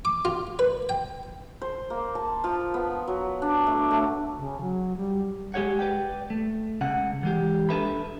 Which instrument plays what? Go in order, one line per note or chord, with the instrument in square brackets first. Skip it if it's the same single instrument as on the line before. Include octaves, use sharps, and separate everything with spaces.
[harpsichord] D6
F4
B4
G5
[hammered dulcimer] C5
A#3
A5
F3
B3
F#3
D4
A3
A3
[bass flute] C#3
F#3
G3
[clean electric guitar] G#3 G4 G#4 C#5 F#5
B4 D5 G5
A3
C#2 C#3 F#5
E3 G#3 G4
D4 A4 B4 E5 B5